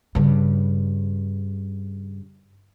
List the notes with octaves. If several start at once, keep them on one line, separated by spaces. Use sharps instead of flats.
G2 C#3